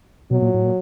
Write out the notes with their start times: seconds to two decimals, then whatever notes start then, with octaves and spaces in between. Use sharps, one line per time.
0.31 B2 F#3
0.42 A#2
0.54 A2
0.65 A#2